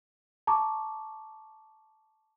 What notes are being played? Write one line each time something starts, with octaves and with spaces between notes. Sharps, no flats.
A5 A#5 C#6 D6